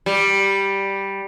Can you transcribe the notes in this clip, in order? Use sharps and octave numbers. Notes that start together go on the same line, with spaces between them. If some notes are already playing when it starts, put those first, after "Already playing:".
G3